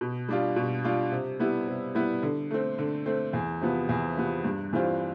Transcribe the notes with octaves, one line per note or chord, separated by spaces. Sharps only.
B2
G3 D4 F4
B2
G3 D4 F4
C3
G3 B3 E4
C3
G3 B3 E4
D3
A3 C4
D3
A3 C4
E2
C3 F3 B3
E2
C3 F3 B3
G2
E3 G3 C4 F4